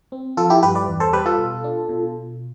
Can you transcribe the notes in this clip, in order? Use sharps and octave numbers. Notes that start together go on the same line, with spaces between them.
C4
F3 F4 A4
E4 G4
G2 G4 B4
B4 D5
E2
A4 C5
G3 G4 B4
F4 A4
B2
D4
B2